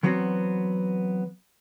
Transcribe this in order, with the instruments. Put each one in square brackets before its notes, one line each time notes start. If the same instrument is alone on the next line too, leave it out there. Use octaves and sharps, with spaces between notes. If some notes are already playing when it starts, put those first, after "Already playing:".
[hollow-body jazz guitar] E3 F#3 B3 C4 F#4